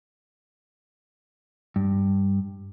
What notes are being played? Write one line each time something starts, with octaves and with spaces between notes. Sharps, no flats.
G2